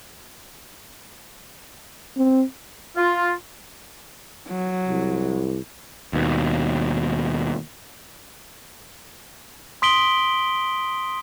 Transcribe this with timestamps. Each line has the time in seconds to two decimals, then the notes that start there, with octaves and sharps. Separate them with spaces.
2.17 C4
2.97 F4
4.48 F#3
4.88 C2
6.13 D#2 B2
9.82 C6 D#6 B6 D7 F#7 G7